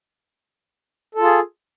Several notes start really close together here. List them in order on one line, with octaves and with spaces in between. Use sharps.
A4 F4 G#4